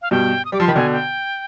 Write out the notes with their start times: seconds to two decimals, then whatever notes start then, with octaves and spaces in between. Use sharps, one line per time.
0.02 F5
0.11 G2 B2 G5
0.45 D#6
0.52 G3 D6
0.60 F3 C6
0.68 D#3 B5
0.76 B2 D3 G#5
0.92 G5